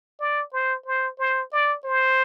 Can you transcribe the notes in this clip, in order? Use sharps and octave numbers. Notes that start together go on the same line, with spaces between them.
D5
C5
C5
C5
D5
C5